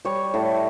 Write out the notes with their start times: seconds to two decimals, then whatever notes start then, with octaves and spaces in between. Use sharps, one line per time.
0.05 G3 C#5
0.34 A2